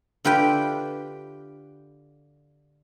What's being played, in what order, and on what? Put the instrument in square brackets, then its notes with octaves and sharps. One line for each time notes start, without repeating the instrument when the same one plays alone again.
[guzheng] D3 F4 G4 B4 E5 G5